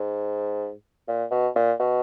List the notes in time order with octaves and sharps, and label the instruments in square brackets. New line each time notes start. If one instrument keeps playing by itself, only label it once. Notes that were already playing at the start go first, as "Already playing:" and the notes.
Already playing: [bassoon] G#2
A#2
B2
A#2
B2